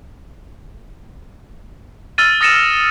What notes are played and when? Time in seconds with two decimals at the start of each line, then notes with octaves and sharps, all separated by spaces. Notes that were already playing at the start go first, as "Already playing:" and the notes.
2.18 E6 F6 A6 D#7
2.41 D#6 A6 A#6 C#7 D#7 E7